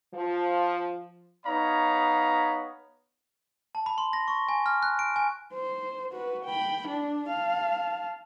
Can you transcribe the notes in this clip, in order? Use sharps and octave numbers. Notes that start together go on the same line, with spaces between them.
F3
B3 D#4 C#5 F5 A#5 B5
A5
B5
C6
A#6
C#6
G#5
F6
F#6
D7
G#5
C5
F#4 B4
G5 B5
D4
F5 A5